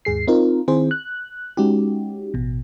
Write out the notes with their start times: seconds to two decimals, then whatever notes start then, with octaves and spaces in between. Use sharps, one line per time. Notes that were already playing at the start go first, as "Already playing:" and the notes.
0.05 D#2 G#2 G#4 C7
0.28 C4 D#4 F4 A#4
0.68 D#3 C4 E4 G#4 C5
0.91 F#6
1.57 G#3 C#4 D#4 F#4 G4
2.34 A1 B2